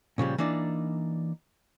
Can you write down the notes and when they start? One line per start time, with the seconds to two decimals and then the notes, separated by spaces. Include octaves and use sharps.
0.18 A#2 C#3 F3 G3
0.38 E3 A#3 D4 D#4 D5